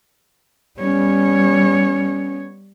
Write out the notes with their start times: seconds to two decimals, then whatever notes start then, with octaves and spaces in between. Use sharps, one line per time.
0.80 G3 B3 C#4 C#5